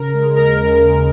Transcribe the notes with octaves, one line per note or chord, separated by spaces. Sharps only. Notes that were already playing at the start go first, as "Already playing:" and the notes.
Already playing: C#3 A#4
G#3
D#2 A#4